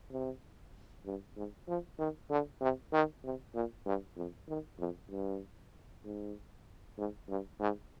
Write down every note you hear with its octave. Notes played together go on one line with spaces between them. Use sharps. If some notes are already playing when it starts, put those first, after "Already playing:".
C3
G2
G#2
F3
D#3
D3
C3
D#3
C3
A#2
G2
F2
D#3
F2
G2
G#2
G#2
G2
G#2